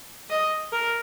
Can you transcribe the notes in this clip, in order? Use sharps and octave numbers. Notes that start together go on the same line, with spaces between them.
D#5
A#4